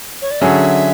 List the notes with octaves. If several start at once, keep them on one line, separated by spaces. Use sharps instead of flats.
C#5
D5
D3 F#3 C#4 G#4 E5